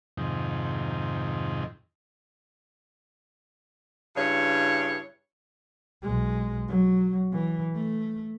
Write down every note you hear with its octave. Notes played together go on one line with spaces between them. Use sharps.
F2 G#2 C3 D#3
G2 C#3 E4 C#5
B1 G#3
F#3
E3
A3